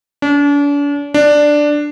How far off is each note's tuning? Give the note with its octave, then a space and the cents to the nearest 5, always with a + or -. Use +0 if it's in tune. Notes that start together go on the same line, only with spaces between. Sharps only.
D4 -40
D4 +5